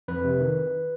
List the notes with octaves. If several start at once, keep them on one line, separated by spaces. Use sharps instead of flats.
F2 B4
C3
D#3